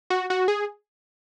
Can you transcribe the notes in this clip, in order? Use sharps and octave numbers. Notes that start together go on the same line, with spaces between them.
F#4
F#4
G#4